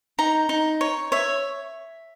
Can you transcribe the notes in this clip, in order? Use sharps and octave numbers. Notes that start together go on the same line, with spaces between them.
D#4 A#5
D#4
C#5
C#5 E5